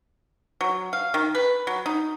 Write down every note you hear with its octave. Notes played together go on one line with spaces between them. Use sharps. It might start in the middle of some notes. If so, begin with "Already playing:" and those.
F#3
F5
D#3
B4
F#3
D#4